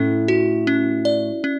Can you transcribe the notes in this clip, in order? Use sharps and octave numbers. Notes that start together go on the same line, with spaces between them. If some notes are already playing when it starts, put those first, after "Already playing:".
Already playing: A2 C#4 A4
F#4
C#4
D5
C#4